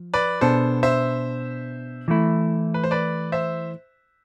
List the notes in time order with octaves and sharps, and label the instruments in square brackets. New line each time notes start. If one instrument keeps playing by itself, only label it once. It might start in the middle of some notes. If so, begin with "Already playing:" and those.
Already playing: [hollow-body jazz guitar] F3
[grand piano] B4 D5
[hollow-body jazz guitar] B2 B3 D4 G#4 [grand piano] A4 C5
[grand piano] C5 E5
[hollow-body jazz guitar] E3 A3 E4
[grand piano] B4
C5
B4 D5
C5 E5